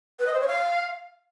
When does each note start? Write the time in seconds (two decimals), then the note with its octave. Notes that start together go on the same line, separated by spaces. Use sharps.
0.19 B4
0.26 D#5
0.33 C5
0.40 C#5
0.47 F5